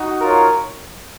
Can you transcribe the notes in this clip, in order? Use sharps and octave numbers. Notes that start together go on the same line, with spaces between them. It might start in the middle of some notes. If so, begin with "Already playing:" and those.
Already playing: D#4 F#4
F4 A#4 C#5